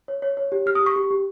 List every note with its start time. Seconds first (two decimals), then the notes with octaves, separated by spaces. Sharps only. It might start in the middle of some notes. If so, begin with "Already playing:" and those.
0.08 C#5
0.22 C#5
0.37 C#5
0.52 G4
0.66 G4 F6
0.75 D#6
0.80 G4
0.86 C#6
0.96 G4
1.11 G4